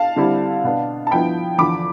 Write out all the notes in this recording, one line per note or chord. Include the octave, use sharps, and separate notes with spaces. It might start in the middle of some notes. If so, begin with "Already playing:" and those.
Already playing: F5 A5
D3 G3 C4 E4
B2 B3 D4
A5
G2 F3 B3 E4 G5 B5
E2 D3 F3 B5 D6